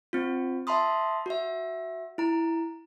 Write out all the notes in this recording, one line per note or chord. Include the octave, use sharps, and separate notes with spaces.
C4 F4
E5 A5 B5 C6 D#6
F#4 E5
E4 A#5